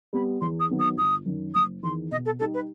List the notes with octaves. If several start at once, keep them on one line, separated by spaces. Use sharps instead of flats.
G3 B3 B5
E2 C6
D#6
D#3 F#3 B3 D#4
D#6
G1 D#6
F#2 D#3
F#1 D#6
E2 D#3 C6
B2 D#5
A4
G3 D#4 G4 A4
B4